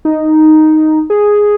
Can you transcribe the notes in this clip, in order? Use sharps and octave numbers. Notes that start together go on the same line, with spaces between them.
D#4
G#4